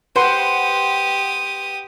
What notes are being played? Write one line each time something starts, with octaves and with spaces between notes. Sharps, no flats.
G4 B4 C5 F#5 D#6